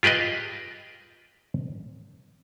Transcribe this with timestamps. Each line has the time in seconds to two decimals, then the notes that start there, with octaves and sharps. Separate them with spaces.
0.03 F4 G4 G#4 B4 D#5